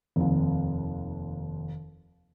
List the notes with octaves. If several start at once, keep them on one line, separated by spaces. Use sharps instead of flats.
F1 D#2